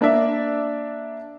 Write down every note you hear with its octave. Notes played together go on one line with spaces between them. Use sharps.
A#3 D4 D5 E5